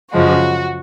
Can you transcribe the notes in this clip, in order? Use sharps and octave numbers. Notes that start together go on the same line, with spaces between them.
F#2 C#3 F3 G#3 F#4